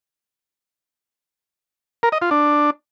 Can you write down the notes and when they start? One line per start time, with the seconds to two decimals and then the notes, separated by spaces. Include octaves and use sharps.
2.03 A#4
2.12 D#5
2.22 F4
2.31 D4